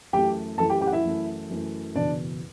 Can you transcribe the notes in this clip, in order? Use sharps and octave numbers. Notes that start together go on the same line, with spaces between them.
F#2 E3 A3 G4 G5
F#2 E3 A3 A4 A5
G4 G5
G4 G5
F#5
E4 E5
F#2 E3 A3
F#2 E3 A3
F#1 E2 B2 D4 D5